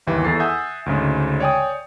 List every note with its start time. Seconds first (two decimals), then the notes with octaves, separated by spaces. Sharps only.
0.07 G1 D#2 E3 G4
0.24 E2 A4 A6 C7
0.40 E5 F#5 G#5 D#6 E6 G6
0.86 D2 G#2 C#3 G#3
1.40 C#5 D5 G5 G#5 D#6